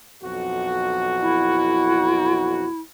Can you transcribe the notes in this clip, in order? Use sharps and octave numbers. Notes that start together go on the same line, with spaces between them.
B1 F2 F#4
E4